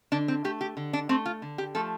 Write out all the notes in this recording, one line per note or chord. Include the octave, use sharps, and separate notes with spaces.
D3 D4
C4
A3 G4
G4
D3
D4
A3 C4
F4
D3
G4
F3 A3 A4